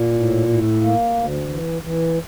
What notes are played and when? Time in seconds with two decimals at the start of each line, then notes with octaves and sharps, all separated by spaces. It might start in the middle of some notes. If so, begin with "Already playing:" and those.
Already playing: A#2
0.13 A2
0.48 A2
0.81 A#3
1.14 D2
1.49 E3
1.82 E3